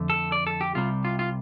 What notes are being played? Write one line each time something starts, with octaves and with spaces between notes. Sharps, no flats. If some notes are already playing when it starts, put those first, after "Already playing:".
Already playing: F2 D3 A3
A4
D5
A4
G4
C2 C3 G3 F4
F4
F4